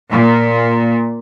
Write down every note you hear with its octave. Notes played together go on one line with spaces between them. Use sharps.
A#2